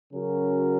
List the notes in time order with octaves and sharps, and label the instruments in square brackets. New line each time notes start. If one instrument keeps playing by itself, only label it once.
[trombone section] C#3 F#3 C#4 F#4 A#4